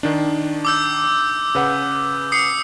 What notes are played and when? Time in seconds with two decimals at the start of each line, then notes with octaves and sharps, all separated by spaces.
0.03 D#3 D4
0.65 D6 E6 G6
1.55 C#3 B4 F#5
2.32 D#6 C7 C#7